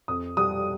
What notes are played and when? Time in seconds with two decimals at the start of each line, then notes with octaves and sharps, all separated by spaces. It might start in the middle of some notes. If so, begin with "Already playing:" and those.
0.08 F2 D#6
0.37 G3 D#6